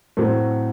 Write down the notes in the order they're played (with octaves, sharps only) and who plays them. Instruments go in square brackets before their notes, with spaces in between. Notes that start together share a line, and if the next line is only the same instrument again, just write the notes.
[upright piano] A2 F#3 A3 C4